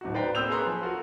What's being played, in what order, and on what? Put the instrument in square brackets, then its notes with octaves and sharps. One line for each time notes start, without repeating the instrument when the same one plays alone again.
[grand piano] D1 D#4 F#4
B4 C5 D5 F5 G5 A#5
A#3 C4 D#6 E6 G6 F7
G#4 B4 C#5 A#5 C6 F#6
F3
F4 F#4 A4 A#4